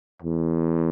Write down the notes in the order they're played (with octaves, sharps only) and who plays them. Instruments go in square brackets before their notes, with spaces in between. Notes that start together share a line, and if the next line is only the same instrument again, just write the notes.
[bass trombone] E2